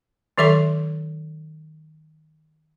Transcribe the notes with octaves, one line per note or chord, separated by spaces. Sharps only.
D#3 F#3 A4 E5 C6 C#6